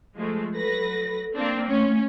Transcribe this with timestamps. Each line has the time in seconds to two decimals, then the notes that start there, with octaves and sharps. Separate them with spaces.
0.16 F3 G#3 A3
0.55 F#3 A4 B4 A#6
1.36 A#3 C4 D4
1.68 A3 C#4